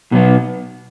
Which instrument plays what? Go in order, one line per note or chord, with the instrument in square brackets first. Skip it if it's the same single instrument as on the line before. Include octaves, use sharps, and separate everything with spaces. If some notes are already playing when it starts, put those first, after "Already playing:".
[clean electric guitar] B2 F#3 B3